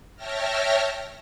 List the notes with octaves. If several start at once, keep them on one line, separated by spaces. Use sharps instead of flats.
C#5 E5 G5 A5 F6 A#6